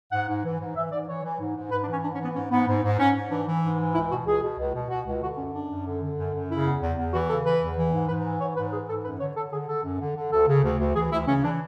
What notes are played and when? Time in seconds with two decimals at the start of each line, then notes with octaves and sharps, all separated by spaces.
0.12 G#2 F#5
0.29 G#2
0.44 E3
0.60 G#2
0.76 E3 E5
0.92 G#2 D5
1.08 E3 C#5
1.24 E3
1.40 G#2
1.56 G#2
1.71 G#2 B4
1.82 D4
1.88 E3
1.93 C#4
2.03 G#2 D4
2.14 C#4
2.20 E3 B3
2.35 G#2 C#4
2.51 G#2 B3
2.68 G#2
2.83 G#2
2.99 G#2 C#4
3.15 G#2
3.31 E3 D4
3.47 E3
3.63 G#2
3.79 E3
3.95 C#2 E4
4.10 B2 F#4
4.26 C#2 G#4
4.42 B2
4.59 C#2
4.75 B2
4.90 B2 F#4
5.06 C#2
5.22 D3 F#4
5.38 F#2 C#4
5.54 F#2 D4
5.70 F#2
5.86 D3
6.02 D3
6.18 F#2
6.34 F#2
6.49 C#3 E4
6.65 E2
6.82 E2
6.98 E2
7.13 E3 F#4
7.29 C#3 A4
7.45 E3 B4
7.61 E2
7.78 E3
7.93 G#2
8.09 G#2 B4
8.25 E3
8.40 G#2 C#5
8.56 G#2 B4
8.72 E3 G#4
8.88 G#2 A4
9.05 F#2 B4
9.20 D3 C#5
9.37 D3 A4
9.52 D3 G#4
9.68 D3 A4
9.84 F#2
10.00 D3
10.16 D3
10.32 D2 A4
10.48 C#3
10.64 D2
10.79 D2
10.95 E3 G#4
11.12 D2 E4
11.27 C#3 C#4
11.44 E3 D4